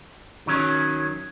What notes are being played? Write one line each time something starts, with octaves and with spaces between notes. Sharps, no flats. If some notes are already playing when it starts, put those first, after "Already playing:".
D#3 F#3 C#4